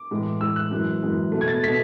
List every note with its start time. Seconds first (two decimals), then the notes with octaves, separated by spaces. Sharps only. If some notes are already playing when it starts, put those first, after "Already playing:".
Already playing: D6
0.11 A2 E3 G#3
0.40 A2 E3 G#3 E6
0.56 F#6
0.71 F#2 E3 G#3
1.02 F#2 E3 G#3
1.32 B2 A3
1.41 G#6
1.48 A6
1.63 B2 A3 B6